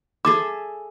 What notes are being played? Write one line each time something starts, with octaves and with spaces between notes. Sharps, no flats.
G#4 A4 E5 D6